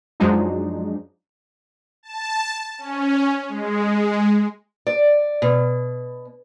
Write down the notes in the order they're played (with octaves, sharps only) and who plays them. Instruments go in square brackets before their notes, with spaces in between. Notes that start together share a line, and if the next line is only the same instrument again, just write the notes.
[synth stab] F#2 F3 F#3 G#3 D4 D#4
[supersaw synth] A5
C#4
G#3
[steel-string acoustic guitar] D5
B2